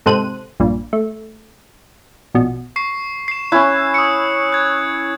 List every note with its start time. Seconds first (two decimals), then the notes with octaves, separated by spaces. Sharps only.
0.06 G#2 C3 A4 C5 F#6 D#7
0.60 A#1 G2 A#2
0.93 A3
2.34 A#1 B2
2.76 C#6 C7
3.28 C7 E7
3.52 C#4 E4 F#6
3.94 D#6 C#7
4.52 F#6 G#6